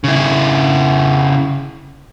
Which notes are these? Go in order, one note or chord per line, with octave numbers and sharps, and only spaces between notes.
C#3 E4